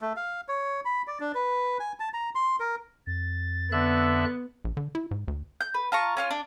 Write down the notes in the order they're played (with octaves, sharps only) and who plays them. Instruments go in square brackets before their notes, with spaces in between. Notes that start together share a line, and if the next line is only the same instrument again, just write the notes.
[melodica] A3
F5
C#5
B5
D5
D4
B4
G#5
A5
A#5
C6
A#4
[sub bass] F2 [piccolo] A6
[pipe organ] D3 E5 F#6 [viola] B3
[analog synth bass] A#1
D3
E4
G#2
D2
[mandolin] G6
B4
F4 A5 A#5 C#6
C#4 F4 F6
D4